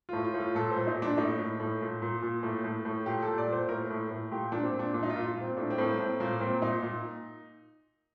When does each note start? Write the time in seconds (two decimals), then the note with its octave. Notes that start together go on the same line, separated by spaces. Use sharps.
0.09 A2 F4
0.24 F4
0.34 A2
0.40 F4
0.55 A#2 A4
0.72 A#2 C5
0.87 D#4
0.97 A#2
1.02 D4
1.17 A2 D#4
1.39 A2
1.60 A2
1.81 A#2
2.02 A#2
2.22 A#2
2.43 A2
2.64 A2
2.85 A2
3.06 A#2 G4
3.22 A4
3.27 A#2
3.38 D5
3.47 A#2
3.53 C5
3.68 A2 A#4
3.90 A2
4.11 A2
4.31 A#2 G4
4.52 A#2 D4
4.63 C4
4.74 A#2
4.79 D4
4.94 A#2 D4
5.03 D#4
5.10 F4
5.16 A#2
5.26 F4
5.36 A#2
5.41 C4
5.57 A2 D4
5.70 C4
5.78 A2
5.85 A#3
5.99 A2 C4
6.20 A#2 A#3
6.41 A#2 C4
6.62 A#2 D#4
6.82 A#2